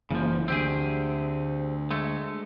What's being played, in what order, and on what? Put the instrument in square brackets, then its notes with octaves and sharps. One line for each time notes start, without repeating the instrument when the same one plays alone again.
[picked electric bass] F#1 E3 A#3 [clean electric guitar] C#3 F3
[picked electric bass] D2 [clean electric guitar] C4 G4 G#4
[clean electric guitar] G#3 A3